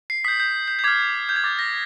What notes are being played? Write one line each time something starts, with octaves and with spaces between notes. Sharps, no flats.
C7
D#6 G6 B6
G6
G6
G6
D6 F6 G#6
G6
G#6
D6 F6 A6
A#6